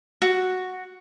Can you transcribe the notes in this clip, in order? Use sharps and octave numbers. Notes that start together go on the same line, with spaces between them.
F#4